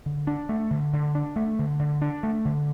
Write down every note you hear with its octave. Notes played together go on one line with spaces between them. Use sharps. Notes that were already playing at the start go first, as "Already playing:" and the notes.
D3
D4
A3
D3
D3
D4
A3
D3
D3
D4
A3
D3